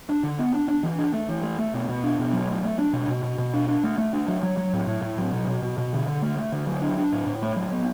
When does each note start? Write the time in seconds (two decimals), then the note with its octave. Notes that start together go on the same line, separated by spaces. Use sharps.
0.09 D4
0.23 D3
0.39 B3
0.54 D4
0.68 D4
0.83 E3
0.99 D4
1.14 A3
1.29 E3
1.43 A3
1.59 A3
1.74 B2
1.89 B2
2.04 D4
2.19 B2
2.33 F#3
2.48 A3
2.64 A3
2.79 D4
2.93 B2
3.08 B2
3.23 B2
3.38 B2
3.54 D4
3.68 D4
3.84 A3
3.98 A3
4.13 D4
4.28 F#3
4.43 F#3
4.57 F#3
4.73 A2
4.87 A2
5.02 A2
5.18 F#3
5.33 B2
5.47 B2
5.62 B2
5.78 B2
5.93 D3
6.07 D3
6.22 A3
6.37 A3
6.52 D3
6.67 F#3
6.82 D4
6.98 D4
7.13 A2
7.27 A2
7.42 A3
7.56 F#3
7.72 B3